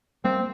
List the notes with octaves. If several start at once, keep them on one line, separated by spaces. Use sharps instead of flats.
G3 A#3 C4